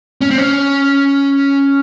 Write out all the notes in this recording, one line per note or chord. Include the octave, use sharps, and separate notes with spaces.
C#4
C4
C#4